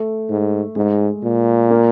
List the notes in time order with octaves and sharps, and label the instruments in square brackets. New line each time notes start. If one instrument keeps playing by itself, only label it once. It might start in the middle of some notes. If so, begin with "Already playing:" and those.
Already playing: [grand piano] A3
[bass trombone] G#2
[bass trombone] G#2 [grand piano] G#3
[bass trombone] A#2
[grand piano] A#3